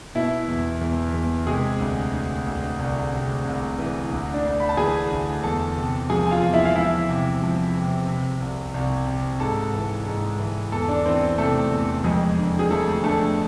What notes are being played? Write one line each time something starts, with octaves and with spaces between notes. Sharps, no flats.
B2 E4
E2
E2
E2
C3 G#3 G#4
D2
D2
D2
C2
C3
C2
E3
D2
D4 D5
D2
B5
A5
E3 G#4 G#5
D2
E2 A4 A5
C3
F3 G#4 G#5
G#5
F4 F5
E2
E4 E5
F5
F3 E4 E5
C3
F3
C3
C3
C2
C2
C3
G#2 A4 A5
E3
G#2
E3
E2 A4 A5
D4 D5
E3 C4 C5
C3 A3 A4
E2
F2 G#3 G#4
D3
G#4
F3 A3 A4
D3 A3 A4